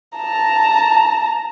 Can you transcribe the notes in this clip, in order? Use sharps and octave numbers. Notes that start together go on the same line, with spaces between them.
A5 A#5